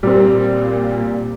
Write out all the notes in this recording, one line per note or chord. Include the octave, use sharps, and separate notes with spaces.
A#2 G3 C4